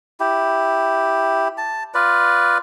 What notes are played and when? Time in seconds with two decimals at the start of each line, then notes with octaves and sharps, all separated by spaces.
0.20 E4 G4
1.58 A5
1.94 F4 B4 D5